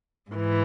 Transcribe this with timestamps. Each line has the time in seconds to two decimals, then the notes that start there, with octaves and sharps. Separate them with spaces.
0.32 G#2 E3